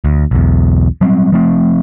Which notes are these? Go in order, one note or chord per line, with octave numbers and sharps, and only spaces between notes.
D2
B1 E2
F#3 G3 C4
F3 A3 C4